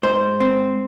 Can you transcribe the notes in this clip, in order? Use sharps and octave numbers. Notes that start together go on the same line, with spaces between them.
G#2 C5
C4